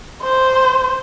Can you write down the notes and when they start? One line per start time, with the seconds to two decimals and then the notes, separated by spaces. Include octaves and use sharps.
0.22 C5